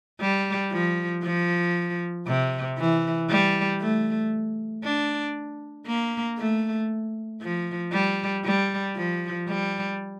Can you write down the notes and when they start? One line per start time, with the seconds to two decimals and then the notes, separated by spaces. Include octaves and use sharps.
0.21 G3
0.72 F3
1.24 F3
2.27 C3
2.78 E3
3.30 G3
3.81 A3
4.84 D4
5.87 A#3
6.38 A3
7.42 F3
7.93 G3
8.45 G3
8.96 F3
9.48 G3